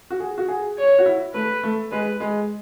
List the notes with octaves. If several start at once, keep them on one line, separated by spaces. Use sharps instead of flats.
F#4
G#4
F#4
G#4
C#5
F#4
E4
A3 B4
A3
G#3 B4
G#3